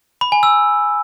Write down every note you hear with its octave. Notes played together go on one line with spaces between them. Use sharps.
B5
G#5
E6